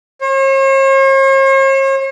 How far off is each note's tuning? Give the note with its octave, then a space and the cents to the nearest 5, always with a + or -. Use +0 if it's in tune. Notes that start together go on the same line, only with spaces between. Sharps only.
C#5 -45